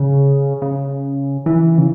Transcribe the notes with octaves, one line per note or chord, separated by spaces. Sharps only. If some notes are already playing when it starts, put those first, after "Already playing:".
Already playing: C#3
C#3
E3
C#3